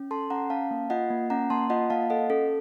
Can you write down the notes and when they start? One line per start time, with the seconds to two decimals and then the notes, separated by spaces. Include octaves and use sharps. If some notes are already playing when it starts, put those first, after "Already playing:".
Already playing: C#4
0.11 A4 A5 C6
0.30 C#4 F#5 A#5
0.50 C#4 F5 A5
0.71 A#3
0.90 F4 D#5 F#5
1.10 A#3
1.30 C#4 F#5 A#5
1.50 A#3 A5 C6
1.70 F4 D#5 F#5
1.90 A#3 F5 A5
2.10 A4 D#5 F#5
2.30 C#4 A4